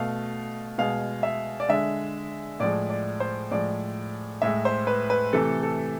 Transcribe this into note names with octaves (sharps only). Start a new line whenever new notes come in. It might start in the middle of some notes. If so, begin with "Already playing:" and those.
Already playing: B2 A3 F5
B2 G#3 F5
E5
D5
D3 G#3 E5
A2 F3 G#3 D5
D5
C5
A2 F3 G#3 D5
A2 G#3 E5
C5
B4
B4
C3 E3 A3 A4
A4